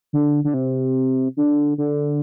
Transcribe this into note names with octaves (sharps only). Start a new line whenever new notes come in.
D3
D3
C3
D3
D3